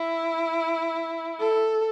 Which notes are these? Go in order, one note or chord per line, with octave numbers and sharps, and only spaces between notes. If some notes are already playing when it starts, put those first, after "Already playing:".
Already playing: E4
A4